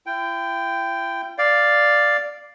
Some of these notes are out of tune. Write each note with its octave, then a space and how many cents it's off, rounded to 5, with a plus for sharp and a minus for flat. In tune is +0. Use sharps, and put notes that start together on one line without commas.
E4 +45 G5 +0
D5 +0 F5 +0